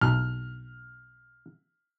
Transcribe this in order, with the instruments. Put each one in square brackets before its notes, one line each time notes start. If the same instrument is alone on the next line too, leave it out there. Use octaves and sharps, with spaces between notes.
[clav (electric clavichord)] B1 [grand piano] F6